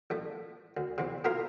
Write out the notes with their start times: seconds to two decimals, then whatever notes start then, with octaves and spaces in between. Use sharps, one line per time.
0.10 A1 A3
0.77 D2
0.98 E2 C3
1.24 B2 A3 E4 F4 A#4 C6